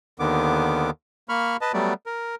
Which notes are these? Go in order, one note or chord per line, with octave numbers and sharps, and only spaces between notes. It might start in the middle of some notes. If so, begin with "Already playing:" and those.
D#2 D3 D#3 B3 D6
A#3 B5 C#6 F6
B4 D#5 A5
F#3 G3 A3 B3 D5
A#4